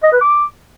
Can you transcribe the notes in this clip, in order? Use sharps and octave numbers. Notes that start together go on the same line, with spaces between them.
D#5
B4
D6